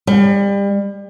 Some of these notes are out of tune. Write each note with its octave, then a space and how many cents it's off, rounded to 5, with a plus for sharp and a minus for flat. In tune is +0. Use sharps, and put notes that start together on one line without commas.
G3 +30